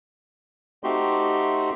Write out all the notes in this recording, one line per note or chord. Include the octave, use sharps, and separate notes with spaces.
A3 C4 D#4 F#4 G4 C6